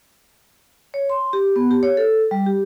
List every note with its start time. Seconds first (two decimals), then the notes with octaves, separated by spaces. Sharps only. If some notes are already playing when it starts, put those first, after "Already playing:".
0.94 C#5
1.10 C6
1.33 G4
1.56 B3
1.71 G4
1.83 C#5
1.97 A4
2.31 G3
2.46 G4